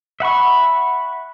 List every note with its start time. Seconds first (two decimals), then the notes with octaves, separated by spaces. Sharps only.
0.20 E5 F#5 B5 C#6